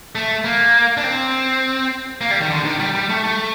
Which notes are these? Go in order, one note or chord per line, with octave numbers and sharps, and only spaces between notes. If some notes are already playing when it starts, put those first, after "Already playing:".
A3
A#3
D4
C4
A#3
G3
D#3
D3
D#3
G3
G3
A3
A3